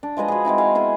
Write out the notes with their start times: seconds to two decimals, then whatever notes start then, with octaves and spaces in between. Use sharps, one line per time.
0.03 D4
0.17 F3 G#3 B4 D#5
0.28 F#4 G#4
0.45 G#3 C4 D#4 E4
0.58 E5 F5 G#5
0.75 B3 E4 G#4 C5